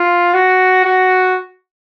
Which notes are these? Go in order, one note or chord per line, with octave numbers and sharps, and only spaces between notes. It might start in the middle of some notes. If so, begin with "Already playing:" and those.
Already playing: F4
F#4
F#4